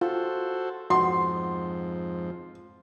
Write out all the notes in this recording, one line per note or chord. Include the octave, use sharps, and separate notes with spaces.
F4 F#4 A4 C5
F2 G#2 F3 F#4 C6